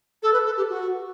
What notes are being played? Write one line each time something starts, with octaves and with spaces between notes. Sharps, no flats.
A4
B4
A4
G4
F#4